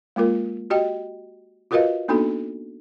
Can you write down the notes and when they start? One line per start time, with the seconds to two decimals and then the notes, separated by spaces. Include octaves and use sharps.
0.16 G#3 A#3 F4 A#4
0.70 F#4 G4 D#5 G5
1.71 F4 F#4 A#4 B4 D#5 F5
2.08 A#3 B3 D4 D#4 F#4 A4